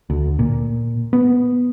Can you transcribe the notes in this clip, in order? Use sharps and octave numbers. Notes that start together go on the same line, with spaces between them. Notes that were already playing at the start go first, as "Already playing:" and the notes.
D2
A#2
B3